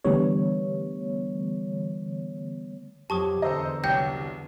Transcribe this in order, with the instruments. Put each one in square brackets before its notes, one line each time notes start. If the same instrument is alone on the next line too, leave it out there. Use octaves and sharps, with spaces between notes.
[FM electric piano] D3 E3 G3 A3 B3 C#5
[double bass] F2 F#3 [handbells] G4 [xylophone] A5 C#6 D#6
[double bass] E2 D3 [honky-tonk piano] A4 C5 D#5 [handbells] A#5 E6
[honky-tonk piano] C2 F#3 [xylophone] G5 G6 A#6